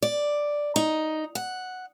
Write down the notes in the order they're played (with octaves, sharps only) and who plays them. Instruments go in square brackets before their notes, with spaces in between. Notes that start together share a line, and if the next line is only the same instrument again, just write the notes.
[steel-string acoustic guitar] D5
D#4
F#5